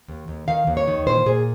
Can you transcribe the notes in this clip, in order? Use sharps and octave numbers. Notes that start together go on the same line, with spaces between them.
D#2
D#2
D#3 F5
D#2
C#5
D#3
A#2 C5
A#2 G#4